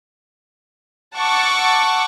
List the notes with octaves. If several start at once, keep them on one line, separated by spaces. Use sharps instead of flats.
F#5 A5 C#6 D6 E6